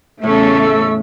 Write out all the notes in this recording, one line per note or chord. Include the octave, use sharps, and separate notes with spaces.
E2 A2 C#3 A3 C#4 A4 C#6 E6